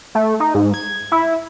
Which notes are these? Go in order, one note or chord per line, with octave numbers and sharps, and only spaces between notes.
A3
D#4
G#2
G#6
E4